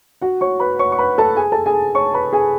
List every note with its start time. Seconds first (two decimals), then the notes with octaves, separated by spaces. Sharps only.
0.21 F#4 F#5
0.41 C#5 C#6
0.60 B4 B5
0.79 C#5 C#6
0.92 C#6
0.98 B4 B5
1.18 A4 A5
1.36 G#4 G#5
1.52 A4 A5
1.66 G#4 G#5
1.95 C#5 C#6
2.14 B4 B5
2.33 G#4 G#5